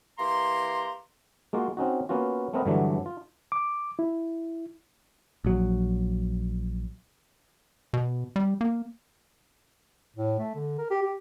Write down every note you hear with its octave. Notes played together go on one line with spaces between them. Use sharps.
E3 A#3 G4 A#5 C6
G#3 A#3 F4 F#4
C4 C#4 D#4 F#4
A#3 B3 C#4 F4 F#4
A3 B3 C4 A#4 B4 D#5
G2 D3 E3 F#3 A3 D4
F4
D6
E4
A#1 F#3
B2
G3
A#3
A2
A3
D3
A#4
G4
G4